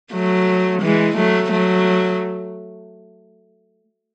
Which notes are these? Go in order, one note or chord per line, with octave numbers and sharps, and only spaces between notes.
F#3 A3
E3 G#3
F#3 A3
F#3 A3